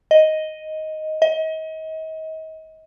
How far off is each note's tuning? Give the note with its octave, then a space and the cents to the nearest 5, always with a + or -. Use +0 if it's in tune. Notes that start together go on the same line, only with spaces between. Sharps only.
D#5 +5
D#5 +35